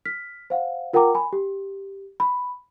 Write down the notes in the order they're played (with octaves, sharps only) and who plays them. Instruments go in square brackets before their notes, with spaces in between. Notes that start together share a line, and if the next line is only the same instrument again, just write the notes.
[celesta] F6 B6
C5 F5 F#5
F4 A#4 F#5 G5 A#5 D6
G#5 B5
G4
B5